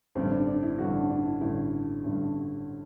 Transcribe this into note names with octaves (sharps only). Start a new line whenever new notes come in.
A1 G2 D3 C4
D4
D4
E4
A1 G2 D3 F#4
D4
D4
E4
A1 G2 D3 E4
A1 G2 D3